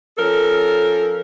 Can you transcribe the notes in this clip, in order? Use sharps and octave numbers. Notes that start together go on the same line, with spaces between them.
F3 C#4 A4 A#4